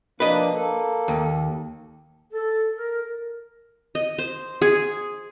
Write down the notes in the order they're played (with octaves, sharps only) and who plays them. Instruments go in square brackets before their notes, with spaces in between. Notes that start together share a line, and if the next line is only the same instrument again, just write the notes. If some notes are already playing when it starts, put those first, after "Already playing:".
[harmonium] F3 A#3 D4 [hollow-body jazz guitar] B4 D#5
[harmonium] A#3 A4
[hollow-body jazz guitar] D#2
[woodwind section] A4
A#4
[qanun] D#5
C5
G#4